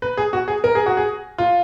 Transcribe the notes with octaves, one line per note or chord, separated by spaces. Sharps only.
B4
G#4
F#4
G#4
A#4
G#4
F#4
G#4
F4